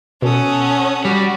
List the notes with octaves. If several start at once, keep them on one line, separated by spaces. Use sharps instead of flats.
B2 C#4 A4 F#5 D#6
G3 F#4